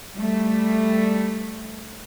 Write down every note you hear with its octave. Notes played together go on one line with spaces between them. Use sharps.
G3 A3